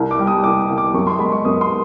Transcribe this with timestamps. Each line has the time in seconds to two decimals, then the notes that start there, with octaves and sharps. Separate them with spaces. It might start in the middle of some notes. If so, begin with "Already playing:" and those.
Already playing: C2
0.11 D6
0.19 G3
0.27 D#6
0.44 C2 D6
0.69 C2
0.78 D6
0.94 F#2 C#6
1.07 C6
1.19 G#3 B5
1.32 C#6
1.45 F#2 D#6
1.61 C6